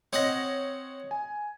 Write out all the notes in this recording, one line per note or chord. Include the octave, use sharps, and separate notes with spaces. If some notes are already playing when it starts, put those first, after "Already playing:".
C4 C#5 D#5 F#5 A#6
G#5